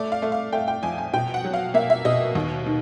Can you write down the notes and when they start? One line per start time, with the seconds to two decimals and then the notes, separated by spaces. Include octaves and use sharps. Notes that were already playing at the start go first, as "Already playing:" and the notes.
Already playing: A3 D5
0.12 F5
0.22 A3
0.32 F5
0.52 A3 G5
0.68 G5
0.83 F2 G#5
0.98 G#5
1.13 B2 G5
1.34 F#5
1.45 F#3
1.54 F5
1.74 A#3 E5
1.90 E5
2.05 B2 D#5
2.35 D#2
2.66 D#3